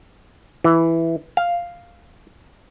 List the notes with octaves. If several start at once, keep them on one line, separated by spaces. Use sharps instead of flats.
E3
F5